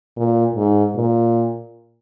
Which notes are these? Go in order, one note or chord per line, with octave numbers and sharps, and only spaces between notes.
A#2
G#2
A#2